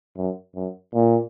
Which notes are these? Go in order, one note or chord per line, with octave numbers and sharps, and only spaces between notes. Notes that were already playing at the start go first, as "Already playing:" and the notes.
F#2
F#2
A#2